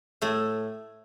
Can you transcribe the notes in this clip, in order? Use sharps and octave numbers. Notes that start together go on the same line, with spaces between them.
A2 A3